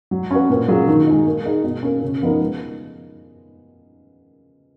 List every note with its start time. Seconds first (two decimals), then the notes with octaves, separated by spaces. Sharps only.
0.11 F#3
0.31 C#4 F#4 B4
0.50 A#2
0.68 F#3 C#4 F4 G#4
0.87 D#3
1.07 G#3 D#4
1.26 A#3
1.45 D#4 G#4
1.64 B2
1.83 A#3 C#4
2.02 C#3
2.22 F3 B3 D#4 A#4
2.41 G#3